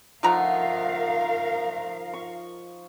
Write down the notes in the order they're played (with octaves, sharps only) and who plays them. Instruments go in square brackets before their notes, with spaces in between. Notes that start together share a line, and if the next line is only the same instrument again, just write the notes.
[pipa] D3 A3 A#5 [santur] F3 D#4 F#5 [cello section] A#4 F5
[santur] C#6